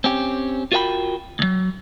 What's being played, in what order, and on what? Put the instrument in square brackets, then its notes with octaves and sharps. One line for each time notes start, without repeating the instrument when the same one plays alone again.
[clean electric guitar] C4 C#4 G4
F4 F#4 A#4 C#5 G5 B5
D2 F#3